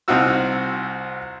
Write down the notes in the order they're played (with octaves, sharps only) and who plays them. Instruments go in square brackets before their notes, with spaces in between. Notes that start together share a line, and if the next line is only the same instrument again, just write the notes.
[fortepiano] C2 C4 D#4 F4 F#4 E6